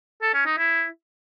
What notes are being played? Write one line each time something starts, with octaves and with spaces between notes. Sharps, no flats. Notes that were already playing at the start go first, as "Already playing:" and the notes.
A4
C#4
D#4
E4